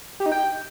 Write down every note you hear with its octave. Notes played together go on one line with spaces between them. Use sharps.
G4
D#4
G5